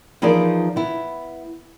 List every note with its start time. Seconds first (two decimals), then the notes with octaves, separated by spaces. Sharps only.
0.22 E3 F3 D#4 G#4 A#4 D5
0.76 B3 E4